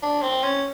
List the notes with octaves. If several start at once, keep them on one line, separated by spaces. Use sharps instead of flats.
D4
C4
C#4